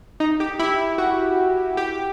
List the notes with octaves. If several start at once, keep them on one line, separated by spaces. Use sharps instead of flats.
D#4
G4
E4
E4
F#4
G4